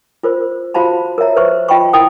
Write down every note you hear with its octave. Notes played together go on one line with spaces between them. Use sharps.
F4 A#4 C5
F4 F#4 C5 F5 A5 B5
A#4 C#5 E5 A#5
B4 C5 E5 C#6
F4 D#5 G5 A5 B5 C#6
E4 A#4 G5 D#6